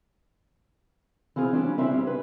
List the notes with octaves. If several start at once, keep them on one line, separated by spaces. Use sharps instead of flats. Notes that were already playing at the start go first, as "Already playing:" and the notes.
E3 C4 F4 G#4
G3 C#4 D4
C#3 C4 C#4 E4 E5
G3
B4